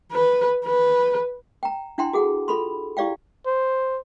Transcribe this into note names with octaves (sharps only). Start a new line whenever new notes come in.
B4
B4
G5 A#5
D4 E4 F#5 G5 A#5 C6
F#4 G#4 A4 F#5
F4 A4 B5 C6
E4 G4 D5 F5 G5
C5